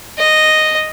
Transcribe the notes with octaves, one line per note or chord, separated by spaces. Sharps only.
D#5